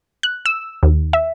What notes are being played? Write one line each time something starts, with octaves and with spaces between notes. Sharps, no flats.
F#6
E6
D#2
E5